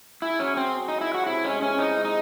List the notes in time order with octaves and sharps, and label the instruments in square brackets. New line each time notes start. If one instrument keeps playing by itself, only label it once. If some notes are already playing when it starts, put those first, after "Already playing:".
[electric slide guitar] E4 [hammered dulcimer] G#4
[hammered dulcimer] F#3 [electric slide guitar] C#4
[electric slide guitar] C4 [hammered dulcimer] G#4
[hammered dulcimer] F#3
[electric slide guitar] D#4 [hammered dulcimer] G#4
[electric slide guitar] E4
[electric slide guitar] F#4 [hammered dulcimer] C#5
[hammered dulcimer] C3 [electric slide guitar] E4
[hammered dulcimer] G#3 [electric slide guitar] C#4
[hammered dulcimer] E3 [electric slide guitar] C#4
[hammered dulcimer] E3 [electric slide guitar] D#4
[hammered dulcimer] G#3
[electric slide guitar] D#4